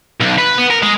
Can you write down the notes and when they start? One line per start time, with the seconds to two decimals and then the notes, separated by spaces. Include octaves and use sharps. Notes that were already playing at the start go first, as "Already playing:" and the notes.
0.20 B1
0.38 B4
0.58 B3
0.70 A#4
0.83 G#3